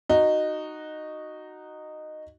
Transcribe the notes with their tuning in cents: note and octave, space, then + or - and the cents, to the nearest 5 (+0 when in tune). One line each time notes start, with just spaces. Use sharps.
D#4 -10 F#4 +0